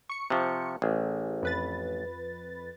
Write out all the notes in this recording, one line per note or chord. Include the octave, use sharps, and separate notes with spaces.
C#6 C#7
C3 F3
A1 G#4
F2 B4 A6